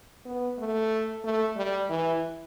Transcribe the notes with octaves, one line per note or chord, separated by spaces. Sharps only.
B3
A3
A3
G3
E3